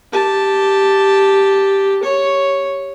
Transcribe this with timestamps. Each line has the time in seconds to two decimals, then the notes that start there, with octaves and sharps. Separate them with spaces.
0.12 G4 A5
2.03 C#5